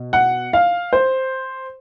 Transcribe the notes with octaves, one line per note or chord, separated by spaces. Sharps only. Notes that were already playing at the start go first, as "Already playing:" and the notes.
Already playing: B2
F#5
F5
C5